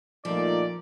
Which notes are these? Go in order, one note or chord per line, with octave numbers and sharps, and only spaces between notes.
A#2 F3 A3 D#4 D5